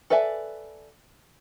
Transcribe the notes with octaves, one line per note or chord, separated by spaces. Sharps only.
A4 B4 D5 E5 G#5